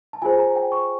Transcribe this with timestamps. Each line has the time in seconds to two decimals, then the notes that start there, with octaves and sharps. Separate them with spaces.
0.13 A5
0.22 F4 G#4 C5 G#5
0.39 A#5
0.56 G5
0.72 C#6